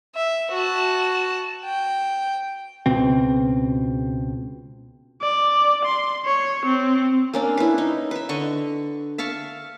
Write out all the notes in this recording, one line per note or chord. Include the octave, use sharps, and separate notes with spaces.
E5
F#4 A5
G5
C#2 B2 C4
D5
C6
C#5
C4
A#3 C#4 D4
E4 B4
D#4
B4 E5
D3 D#5 C#6
E5 F5 A5 C#6